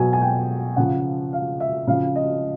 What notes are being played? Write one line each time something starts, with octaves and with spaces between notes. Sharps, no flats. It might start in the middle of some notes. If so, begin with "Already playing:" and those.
Already playing: B2 F#3 G#5
G#5
G5
C#3 F3 F#5
F5
E5
C#3 F3 F5
D#5